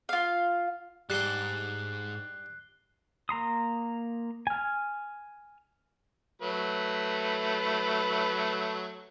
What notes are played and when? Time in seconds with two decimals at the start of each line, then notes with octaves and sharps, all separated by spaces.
0.09 F4 F5
1.10 G#2 G3 D4 F#6 C7 G7
3.29 A#3 A#5 C6 D#6
4.47 G#5 F6
6.42 F#3 A3 B4